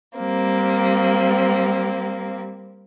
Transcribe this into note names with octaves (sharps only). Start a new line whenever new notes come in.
G3 A#3 C4